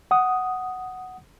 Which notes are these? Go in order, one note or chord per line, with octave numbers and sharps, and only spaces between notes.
F#5 D#6